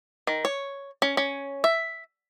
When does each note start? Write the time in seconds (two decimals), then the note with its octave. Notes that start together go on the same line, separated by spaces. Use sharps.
0.27 D#3
0.45 C#5
1.02 C#4
1.17 C#4
1.64 E5